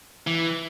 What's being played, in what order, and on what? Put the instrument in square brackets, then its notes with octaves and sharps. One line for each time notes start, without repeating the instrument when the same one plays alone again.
[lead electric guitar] E3